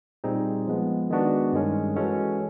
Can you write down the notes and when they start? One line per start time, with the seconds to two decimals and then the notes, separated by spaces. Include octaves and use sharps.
0.24 A#2 G3 C4 D#4 G#4
0.67 F3 G#3 B3
1.10 D#3 G#3 B3 D4 F#4
1.53 G2 D#3 G#3 C#4
1.96 E3 G#3 C#4 F#4 A4